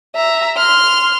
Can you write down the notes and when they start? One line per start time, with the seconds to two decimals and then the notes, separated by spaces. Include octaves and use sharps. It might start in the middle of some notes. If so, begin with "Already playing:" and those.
0.16 E5 A#5
0.57 C6 F6